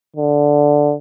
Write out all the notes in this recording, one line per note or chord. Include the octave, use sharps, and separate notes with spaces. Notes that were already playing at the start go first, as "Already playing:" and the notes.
D3